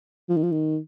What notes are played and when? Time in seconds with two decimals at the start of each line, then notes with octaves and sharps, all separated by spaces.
0.29 F3
0.36 D#3
0.43 F3
0.52 D#3